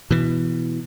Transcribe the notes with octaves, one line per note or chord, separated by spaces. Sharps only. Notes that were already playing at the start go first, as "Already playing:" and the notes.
B2 E3